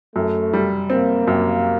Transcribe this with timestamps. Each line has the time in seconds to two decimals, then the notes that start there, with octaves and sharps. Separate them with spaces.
0.16 F#2 A3
0.53 G3
0.90 A#3 C4
1.28 F#2